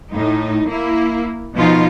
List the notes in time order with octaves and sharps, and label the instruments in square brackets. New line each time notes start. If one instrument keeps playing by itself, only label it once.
[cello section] A2 D#4
A#3 E4
B2 F3 D#4 F4